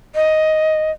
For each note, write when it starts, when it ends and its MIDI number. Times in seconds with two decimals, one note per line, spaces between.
0.15 0.91 75